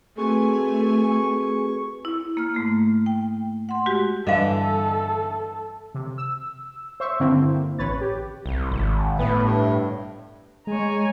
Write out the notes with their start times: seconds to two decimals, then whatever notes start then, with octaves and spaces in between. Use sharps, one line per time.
0.18 A3 C4 F#4 G#4 B4 G#5 C#6
2.05 E4
2.37 A#3 F6
2.54 G#2 A3 A#3
3.06 G5
3.69 F#5 C6
3.86 G#3 F#4 G4
4.27 G2 D3 E3 A4 D#5 F5
5.95 C3
6.18 E6
7.00 C5 E5 C#6 E6
7.20 G2 D3 A#3 C4 E4
7.79 A1 B4 C#5 A6
8.01 G4
8.46 C2
8.72 G#1
9.19 A2 B3
9.43 G2
10.67 G#3 C#5 G#5 A#5